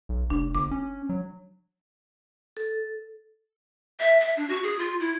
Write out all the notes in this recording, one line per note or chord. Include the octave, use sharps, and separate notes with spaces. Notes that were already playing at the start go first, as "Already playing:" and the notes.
B1
F1 D4
G1 D6
C#4
F#3
A4
E5
E5
D4
F#4
G#4
F4
E4